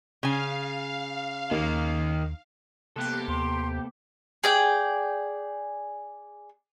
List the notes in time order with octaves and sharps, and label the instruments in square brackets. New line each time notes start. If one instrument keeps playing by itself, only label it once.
[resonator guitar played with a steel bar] C#3 G#5 [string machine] F5
[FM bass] D#2 [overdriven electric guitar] D#3 A#3
[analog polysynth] C3 G4 [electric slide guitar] A#3 B3 A4 [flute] F#6
[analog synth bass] D#2 [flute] C6
[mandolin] G#4 D5 G5